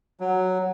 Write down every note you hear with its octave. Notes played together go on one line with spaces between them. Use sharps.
F#3